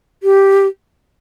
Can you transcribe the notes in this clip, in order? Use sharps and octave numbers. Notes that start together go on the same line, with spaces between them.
G4